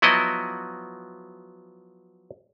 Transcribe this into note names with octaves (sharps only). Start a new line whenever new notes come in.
F3 F#3 B3 E4 F#4 D#5